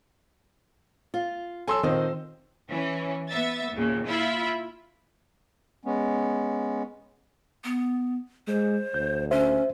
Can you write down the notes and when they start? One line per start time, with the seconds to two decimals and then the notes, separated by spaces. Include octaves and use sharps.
1.14 F4
1.67 F#3 A4 G#5 C6 E6
1.83 A#2 D#3 C4 C5 D#5
2.70 E3 C#4
3.30 B3 E5 A6
3.74 D#2 A#2 C#3
4.06 E4 F4 E5 B5
5.85 G#3 B3 C#4
7.64 B3
8.48 G#3 C5
8.94 D2 G6
9.31 C#4 C5 E5